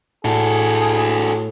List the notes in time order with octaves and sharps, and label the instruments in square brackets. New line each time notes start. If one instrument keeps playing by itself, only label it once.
[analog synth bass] A2 [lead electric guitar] F#4 A4 [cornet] G#4